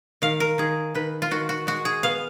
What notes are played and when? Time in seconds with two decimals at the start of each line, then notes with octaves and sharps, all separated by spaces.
0.22 D#3 F5
0.40 A#4
0.58 D#3 G#4
0.95 D#3 B4
1.22 F4
1.31 D#3 F#4
1.49 F#4
1.67 G#3 F#4
1.85 G#4
2.03 B3 F5